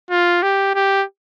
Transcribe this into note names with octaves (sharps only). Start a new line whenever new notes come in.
F4
G4
G4